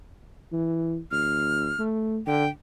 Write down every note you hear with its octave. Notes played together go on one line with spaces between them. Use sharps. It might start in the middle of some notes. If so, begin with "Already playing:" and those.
E3
D2 F6
A3
D3 G5